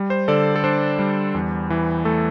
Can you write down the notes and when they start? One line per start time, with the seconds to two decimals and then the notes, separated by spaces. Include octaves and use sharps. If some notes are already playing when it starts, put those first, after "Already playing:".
Already playing: G3
0.10 C5
0.28 D3 A4 D5
0.56 A4
0.64 D4 C5
0.99 G3
1.35 E2
1.70 E3
2.05 A3 A4